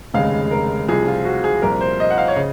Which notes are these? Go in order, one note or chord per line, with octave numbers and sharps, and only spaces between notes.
F1 D#2 C#3 G#3 F5
A#4
C2 C3 F3 G#4
F4
F#4
G#4
C2 A#2 F3 A#4
C5
D#5
F#5
F5
C#5
C#3 D#5